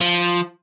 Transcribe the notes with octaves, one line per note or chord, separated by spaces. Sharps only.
F3